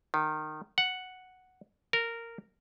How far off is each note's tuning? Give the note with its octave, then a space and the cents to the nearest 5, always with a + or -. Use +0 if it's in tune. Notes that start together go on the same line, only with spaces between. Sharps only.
D#3 -20
F#5 +0
A#4 -10